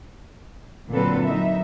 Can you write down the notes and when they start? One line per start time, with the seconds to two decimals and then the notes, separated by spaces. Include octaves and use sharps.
0.91 A#2 D3 F#3 C4 A4 B4
1.26 F#3 D#4 E5